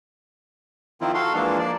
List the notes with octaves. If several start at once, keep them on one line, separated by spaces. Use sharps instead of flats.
D#3 F3 C4 E4 F4
F#4 A4 F5 C6
E3 F3 G#3 A#3 D4
F3 A#3 D5